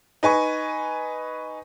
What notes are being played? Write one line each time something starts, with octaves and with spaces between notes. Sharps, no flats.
D#4 B4 G#5 C#6